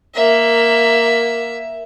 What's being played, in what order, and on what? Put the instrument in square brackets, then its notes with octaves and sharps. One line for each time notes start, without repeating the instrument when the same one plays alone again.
[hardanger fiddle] A#3 E5